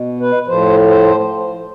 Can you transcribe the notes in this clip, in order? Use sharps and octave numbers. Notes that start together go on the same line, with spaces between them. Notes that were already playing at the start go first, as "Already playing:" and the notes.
Already playing: B2
B4
A2 F3 C5
C5